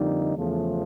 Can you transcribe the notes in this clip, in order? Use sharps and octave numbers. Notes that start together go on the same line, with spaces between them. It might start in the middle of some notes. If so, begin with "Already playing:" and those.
Already playing: F2 D3 G3 A#3 D#4
E2 C#3 F3 A3